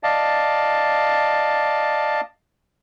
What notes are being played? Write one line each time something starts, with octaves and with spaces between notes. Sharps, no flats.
D5 D#5 F5 A5